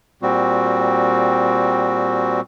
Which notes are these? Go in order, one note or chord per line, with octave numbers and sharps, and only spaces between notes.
A#2 G3 C4 F#4